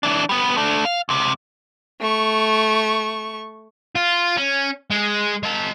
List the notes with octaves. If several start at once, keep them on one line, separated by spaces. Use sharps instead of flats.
E3 D4
G3 B3
A3 D4
F5
C#2 C3
A3 C#6
F4
C#4
G#3
G#3 A5